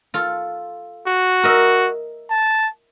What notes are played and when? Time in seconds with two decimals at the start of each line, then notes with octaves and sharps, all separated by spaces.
0.14 F4 A4
1.07 F#4
1.43 A#4 D#5 E5
2.31 A5